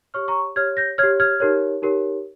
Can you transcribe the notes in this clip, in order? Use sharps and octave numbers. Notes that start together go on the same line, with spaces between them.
G4 C#5 C#6 F6
A#5 C#6
G4 C#5 F6 G#6
G6 A#6
C#5 F6 G#6
G4
F6 G#6
D#4 G4 A#4 C#5
D#4 G4 A#4 C#5